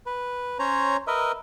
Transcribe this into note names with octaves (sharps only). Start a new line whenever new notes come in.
B4
C#4 C5 C#5 A#5
A#4 B4 D#5 E5